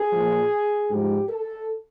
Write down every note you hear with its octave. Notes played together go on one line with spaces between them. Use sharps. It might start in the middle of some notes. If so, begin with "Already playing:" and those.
Already playing: G#4
A#2 F3
G#2 F3 G4
A4